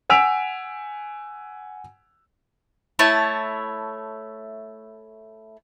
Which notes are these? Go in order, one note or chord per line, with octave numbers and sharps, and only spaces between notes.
F#5 G#5 E6 B6 D7 F7
A3 E4 C#5 A5